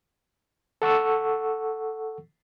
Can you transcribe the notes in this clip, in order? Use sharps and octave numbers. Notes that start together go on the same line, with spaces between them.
A4 F#5 C#6 E6